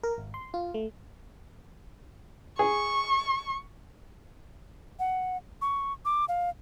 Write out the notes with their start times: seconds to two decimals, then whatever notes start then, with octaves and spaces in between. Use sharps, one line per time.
0.03 A#4
0.18 G#1
0.34 C6
0.54 F4
0.74 A3
2.59 G#4 C#6
4.99 F#5
5.62 C#6
6.05 D6
6.29 F5